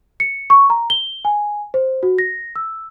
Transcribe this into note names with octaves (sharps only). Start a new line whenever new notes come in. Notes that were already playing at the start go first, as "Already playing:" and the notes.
C#7
C#6
A#5
G7
G#5
C5
F#4
A#6
E6